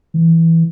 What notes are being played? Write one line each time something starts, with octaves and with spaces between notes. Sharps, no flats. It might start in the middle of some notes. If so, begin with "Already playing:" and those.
E3